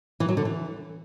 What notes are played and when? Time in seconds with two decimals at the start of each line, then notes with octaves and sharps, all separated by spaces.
0.20 E3
0.29 F#3
0.37 D3
0.45 E3